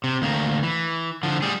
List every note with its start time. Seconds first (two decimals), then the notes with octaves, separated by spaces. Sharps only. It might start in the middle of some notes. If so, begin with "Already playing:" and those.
0.04 C3
0.22 D2 A#3
0.63 E3
1.23 D3 F3
1.42 G3 G#4